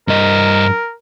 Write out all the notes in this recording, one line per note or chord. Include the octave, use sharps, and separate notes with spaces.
G2 A#4 D#5